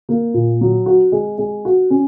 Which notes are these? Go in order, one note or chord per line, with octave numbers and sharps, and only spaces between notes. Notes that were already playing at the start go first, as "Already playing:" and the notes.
A#3
A#2
F#3
F#4
G#3
G#3
F#4
C#4